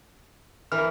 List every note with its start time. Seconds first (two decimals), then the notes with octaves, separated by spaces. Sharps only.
0.72 E3 A#4 F6